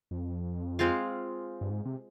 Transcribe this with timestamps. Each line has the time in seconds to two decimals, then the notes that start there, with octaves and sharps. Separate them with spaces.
0.11 F2
0.79 G#3 C4 F4
1.61 G2
1.70 G#2
1.85 C3